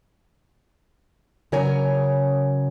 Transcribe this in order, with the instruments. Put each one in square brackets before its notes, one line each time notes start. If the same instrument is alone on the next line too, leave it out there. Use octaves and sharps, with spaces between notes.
[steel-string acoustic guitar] C#3 F#3 A#4 C#5 G#5